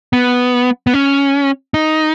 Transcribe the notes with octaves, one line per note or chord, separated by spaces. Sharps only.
B3
B3
C#4
D#4